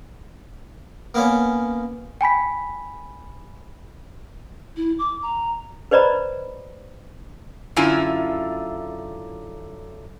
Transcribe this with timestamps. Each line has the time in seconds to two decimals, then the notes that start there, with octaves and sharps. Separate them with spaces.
1.14 A#3 B3 C#4
2.21 G5 G#5 B5 B6
4.77 E4
4.99 D6
5.22 A#5
5.91 B4 C5 D5 D#5 A#5 B5
7.76 F#2 D3 E4 F4 G#5